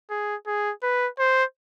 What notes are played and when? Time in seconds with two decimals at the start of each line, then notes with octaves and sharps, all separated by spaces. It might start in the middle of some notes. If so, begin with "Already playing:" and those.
0.10 G#4
0.47 G#4
0.83 B4
1.19 C5